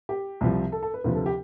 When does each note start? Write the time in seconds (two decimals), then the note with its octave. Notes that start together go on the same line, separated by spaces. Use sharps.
0.09 G4
0.41 C2 C3 F3
0.72 A4
0.83 A4
0.94 B4
1.04 D2 C3 F3 B4
1.15 A4
1.26 G4